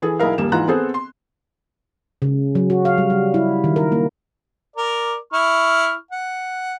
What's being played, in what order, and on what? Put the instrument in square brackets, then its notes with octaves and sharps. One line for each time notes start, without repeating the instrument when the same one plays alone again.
[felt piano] E3 G#4 A4
B1 E4 G#4 A#4 F5
D#1 G3 A#3 E7
G#2 E3 F4 A#5 F#6
B3 C4 G#4 A4 C5
C6
[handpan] C#3
F#3
F#4
F5
G3
G3
E4
D#3
A#4
A#3
[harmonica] A#4 D5
E4 C#6 F6
F#5